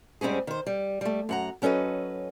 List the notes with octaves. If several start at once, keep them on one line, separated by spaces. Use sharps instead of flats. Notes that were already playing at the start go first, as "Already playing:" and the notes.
G#2 G3 C4 C#4 G#4
D#3 C5
G3
G3 A3
F#2 F#5 A#5
F#3 C#4 A4 B4 D#5